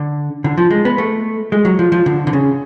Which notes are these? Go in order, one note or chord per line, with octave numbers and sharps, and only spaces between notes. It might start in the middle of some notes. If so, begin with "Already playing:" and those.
Already playing: D3
D3
F3
G#3
B3
A3
G#3
F#3
F3
F3
D3
D3
C#3